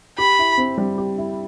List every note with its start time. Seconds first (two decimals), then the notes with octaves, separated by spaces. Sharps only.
0.18 G4 B5
0.39 E4
0.58 C4
0.78 G3
0.98 G4
1.18 E4